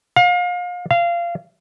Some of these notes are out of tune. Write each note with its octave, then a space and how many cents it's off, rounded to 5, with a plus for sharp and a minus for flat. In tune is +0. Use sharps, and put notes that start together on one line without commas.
F5 +35
F5 -20